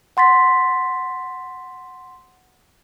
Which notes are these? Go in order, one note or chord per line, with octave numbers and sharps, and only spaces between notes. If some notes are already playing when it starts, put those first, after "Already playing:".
F#5 C6 A6 B6